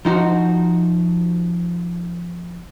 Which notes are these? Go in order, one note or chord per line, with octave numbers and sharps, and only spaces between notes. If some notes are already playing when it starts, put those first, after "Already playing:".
F3 D#4 F#4 C5